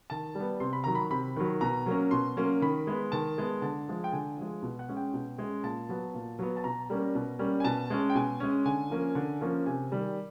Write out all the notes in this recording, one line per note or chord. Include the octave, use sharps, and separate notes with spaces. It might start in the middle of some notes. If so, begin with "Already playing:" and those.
D#3 A5
G3 B3
C3 C6
B5
D#3 F#3 A#5
B5
C3 B5
D#3 F#3
B2 A#5
F#3 A#3 C#4
B2 C6
F#3 A#3 C#4
D#3 B5
G#3 B3
D#3 A5
G#3 B3
D3 A5
F3 G#3
G5
D3 G#5
F3 G#3
B2
F#5
G#3 C#4
G5
B2
G#3 C#4
A#2 A5
F#3 B3
A#2
F#3 B3
A5
B2 A#5
G3 A#3 C#4
B2
G3 A#3 C#4
G#5
B2 A5
G#3 C#4
G5
B2 G#5
G#3 C#4
D3 G#5
F3 A#3 C#4
D3
F3 A#3 C#4
C3 G#5
D#3 G3